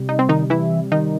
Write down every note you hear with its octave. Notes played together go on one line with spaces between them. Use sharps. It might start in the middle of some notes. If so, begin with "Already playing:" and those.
Already playing: C3 G3
D#4
C4
D#3 D#4
E3 E4
D#3 D#4